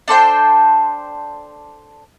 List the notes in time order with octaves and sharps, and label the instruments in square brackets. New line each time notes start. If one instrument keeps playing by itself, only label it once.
[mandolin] D4 A4 C5 G5